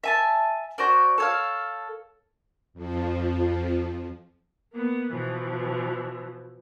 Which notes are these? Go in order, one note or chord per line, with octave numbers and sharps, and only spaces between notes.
E5 G#5 A5
F#4 C5 D5
A4 C#5 F5
F2 F3
A#3 B3
B2 E3 F3